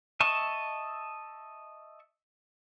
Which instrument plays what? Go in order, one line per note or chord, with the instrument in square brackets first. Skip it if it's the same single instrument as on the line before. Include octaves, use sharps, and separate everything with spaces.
[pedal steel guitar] D#5 E5 A5 C#6